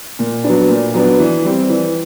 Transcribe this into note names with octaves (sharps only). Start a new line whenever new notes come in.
A#2
F#3 B3 D4
A#2
F#3 B3 D4
E3
G3 C4
E3